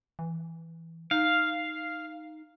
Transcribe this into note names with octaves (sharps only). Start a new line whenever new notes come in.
E3
D#4 F5